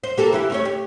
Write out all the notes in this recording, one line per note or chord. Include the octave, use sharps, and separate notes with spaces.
C5
A#3 G4 A4
E3 E4 G4
A3 C#4 C#5
G4